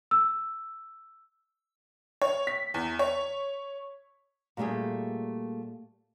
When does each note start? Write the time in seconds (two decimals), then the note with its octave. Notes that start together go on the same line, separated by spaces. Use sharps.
0.11 E6
2.22 C#5
2.47 B6
2.74 E2
2.99 C#5
4.57 A#2 G3 A3 G4 G#4